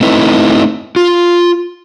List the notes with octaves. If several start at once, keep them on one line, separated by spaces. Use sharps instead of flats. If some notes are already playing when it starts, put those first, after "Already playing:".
A3 C4 D#4 E4 B4
F4